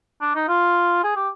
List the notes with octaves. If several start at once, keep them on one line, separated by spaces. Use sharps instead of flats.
D4
D#4
F4
G#4
G4